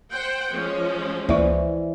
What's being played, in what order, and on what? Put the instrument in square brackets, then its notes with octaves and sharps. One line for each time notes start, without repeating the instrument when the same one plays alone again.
[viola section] C5 F#5 G5
F3 G#3 C#4
[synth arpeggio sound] C#2 A#3 C#6 [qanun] E3 [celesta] C5 D5 E5